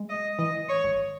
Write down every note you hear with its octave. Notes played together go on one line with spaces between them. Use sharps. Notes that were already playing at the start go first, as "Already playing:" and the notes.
Already playing: G#3
D#5
E3 D#5
C#5
G#1